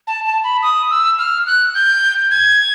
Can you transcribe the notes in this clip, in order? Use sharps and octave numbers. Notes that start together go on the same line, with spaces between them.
A5
A5
B5
D#6
E6
F6
F#6
G6
G#6